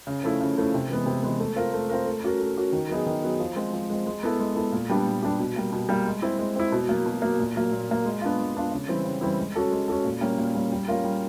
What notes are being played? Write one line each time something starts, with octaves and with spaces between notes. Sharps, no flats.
C#3
F3 A3 C#4 E4
C#3
F3 A3 C#4 E4
C3
E3 G#3 B3
C3
E3 G#3 B3
A3
C4 F4 A#4
A3
C4 F4 A#4
A3
C#4 F#4 A#4
A3
C#4 F#4 A#4
D#3
F#3 B3 D#4 G#4
D#3
F#3 B3 D#4 G#4
F3
G#3 C4
F3
G#3 C4
G#3
B3 E4 A4
G#3
B3 E4 A4
A#2
G3 B3 D4 G4
A#2
G3 B3 D4 G4
B2
G3 A#3
B2
G3 A#3
G#3
C4 E4
G#3
C4 E4
B2
F#3 A#3
B2
F#3 A#3
A#2
F#3 A#3
A#2
F#3 A#3
G#3
B3 D4 F4
G#3
B3 D4 F4
C#3
E3 G3 C4 E4
C#3
E3 G3 C4 E4
G#3
C#4 F#4 A4
G#3
C#4 F#4 A4
A#2
G3 A#3 C#4
A#2
G3 A#3 C#4
G3
A#3 C#4 F4 A#4
G3